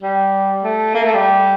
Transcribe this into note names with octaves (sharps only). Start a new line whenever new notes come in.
G3
A3
A#3
A3
G3